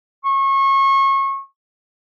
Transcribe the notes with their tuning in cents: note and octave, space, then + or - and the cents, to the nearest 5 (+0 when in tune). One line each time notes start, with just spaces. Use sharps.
C#6 -30